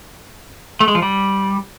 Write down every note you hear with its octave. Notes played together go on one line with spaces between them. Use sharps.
A3
G#3
F3
G3